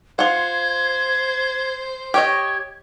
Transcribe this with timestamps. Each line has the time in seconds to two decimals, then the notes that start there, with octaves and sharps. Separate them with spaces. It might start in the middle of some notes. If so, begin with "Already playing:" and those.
0.19 F4 C5 F#5 G#6
2.14 G4 C#5 D#5 G#6